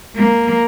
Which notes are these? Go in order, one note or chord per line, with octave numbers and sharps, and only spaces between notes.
A#3